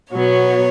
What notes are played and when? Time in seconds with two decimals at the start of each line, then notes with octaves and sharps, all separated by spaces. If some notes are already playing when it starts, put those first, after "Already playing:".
0.12 B2 F#3 B3 C#5